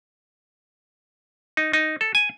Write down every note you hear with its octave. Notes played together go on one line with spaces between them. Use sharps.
D#4
D#4
A4
G#5